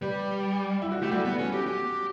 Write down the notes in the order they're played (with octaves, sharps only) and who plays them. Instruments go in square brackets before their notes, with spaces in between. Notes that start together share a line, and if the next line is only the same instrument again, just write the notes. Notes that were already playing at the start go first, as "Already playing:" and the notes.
[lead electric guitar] G3 [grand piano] G4 B4
[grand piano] E4
F#4
[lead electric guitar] A3 [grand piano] G4
[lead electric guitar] G3 [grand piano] F#4 A4
[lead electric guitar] B3
C#4
G4
G4